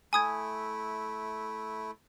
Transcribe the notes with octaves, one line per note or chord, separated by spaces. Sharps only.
A3 E4 G#5 D#6 G#6